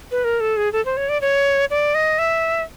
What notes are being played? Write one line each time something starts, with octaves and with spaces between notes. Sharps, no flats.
B4
A#4
A4
G#4
A4
C5
C#5
D5
C#5
D5
D#5
E5